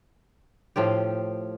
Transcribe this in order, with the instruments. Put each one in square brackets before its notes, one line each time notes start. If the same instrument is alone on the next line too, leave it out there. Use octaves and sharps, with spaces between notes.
[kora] A2 F3 F4 G4